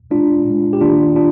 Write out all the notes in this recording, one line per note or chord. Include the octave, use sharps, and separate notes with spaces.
A#2 G#3 D4 F4
A#2 G#3
G4
D#2 D#3 A#3 D4 F4
D4 F4